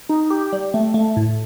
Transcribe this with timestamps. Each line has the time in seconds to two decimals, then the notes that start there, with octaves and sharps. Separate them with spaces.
0.09 D#4
0.30 G4
0.53 G3
0.74 A3
0.94 A3
1.17 A2